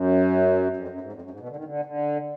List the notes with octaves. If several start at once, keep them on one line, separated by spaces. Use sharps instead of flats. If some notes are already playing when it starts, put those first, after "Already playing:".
Already playing: F#2
F2
F#2
G#2
F2
F#2
G#2
B2
D3
D#3
D3
D3